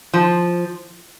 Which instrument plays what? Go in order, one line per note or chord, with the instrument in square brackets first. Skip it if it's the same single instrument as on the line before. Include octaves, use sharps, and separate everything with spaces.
[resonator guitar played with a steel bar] F3